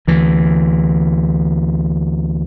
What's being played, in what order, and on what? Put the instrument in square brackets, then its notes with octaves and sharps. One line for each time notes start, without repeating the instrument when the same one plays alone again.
[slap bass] D2 E3